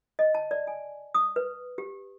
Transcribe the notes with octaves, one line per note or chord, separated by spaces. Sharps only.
D#5
A5
D5
G#5
D#6
B4
G4